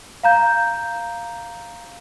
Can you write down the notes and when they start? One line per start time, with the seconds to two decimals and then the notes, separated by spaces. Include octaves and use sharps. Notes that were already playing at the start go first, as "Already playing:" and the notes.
0.24 F5 A#5 G6